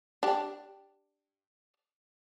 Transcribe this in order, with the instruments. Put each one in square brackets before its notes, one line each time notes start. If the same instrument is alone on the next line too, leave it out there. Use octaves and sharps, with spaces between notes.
[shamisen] D4 G4